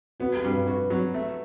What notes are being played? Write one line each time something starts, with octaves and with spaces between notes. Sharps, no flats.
B3 F#4
G4
G2
B4
F#4 B4
F#3
A3